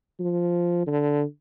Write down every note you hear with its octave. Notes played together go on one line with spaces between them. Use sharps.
F3
D3